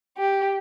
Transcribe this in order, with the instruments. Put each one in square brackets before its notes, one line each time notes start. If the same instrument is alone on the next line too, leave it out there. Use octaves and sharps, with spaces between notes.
[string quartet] G4